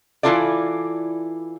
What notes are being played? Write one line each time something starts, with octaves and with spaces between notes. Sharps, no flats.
E3 B3 E4 F4 A4 D5